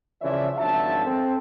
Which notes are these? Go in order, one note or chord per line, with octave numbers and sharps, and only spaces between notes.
C#3 E3 F3 C#5 D5 E5
G#1 F3 F#3 D4 E5 A5
C4 A4